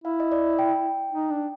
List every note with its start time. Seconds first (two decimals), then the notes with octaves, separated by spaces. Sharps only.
0.04 E4 F5
0.20 D#5
0.32 D5
0.59 G5
1.12 D#4
1.31 D4